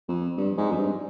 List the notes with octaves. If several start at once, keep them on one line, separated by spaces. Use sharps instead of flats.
F2
G2
G#2
F2
G2